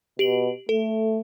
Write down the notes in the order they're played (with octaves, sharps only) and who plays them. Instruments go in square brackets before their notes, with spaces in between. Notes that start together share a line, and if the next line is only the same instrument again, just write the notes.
[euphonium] B2 [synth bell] G4 D7 F#7
[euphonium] A3 [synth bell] A4